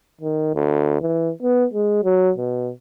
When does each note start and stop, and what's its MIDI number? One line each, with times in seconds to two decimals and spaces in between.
0.21 0.53 51
0.54 0.97 38
1.01 1.31 52
1.42 1.65 59
1.74 2.00 56
2.04 2.32 54
2.38 2.71 47